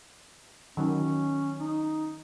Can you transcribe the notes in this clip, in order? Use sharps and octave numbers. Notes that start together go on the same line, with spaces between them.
D#3 F#3 C#4
D#4